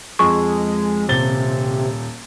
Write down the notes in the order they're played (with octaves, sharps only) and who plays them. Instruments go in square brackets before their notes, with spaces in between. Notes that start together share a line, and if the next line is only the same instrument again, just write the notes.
[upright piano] F2 [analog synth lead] G#3 [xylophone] C#6
[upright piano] D#1 A6 G7 [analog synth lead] C3